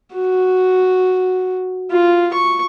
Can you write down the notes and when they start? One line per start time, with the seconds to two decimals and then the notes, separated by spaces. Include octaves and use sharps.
0.14 F#4
1.91 F4
2.33 C#6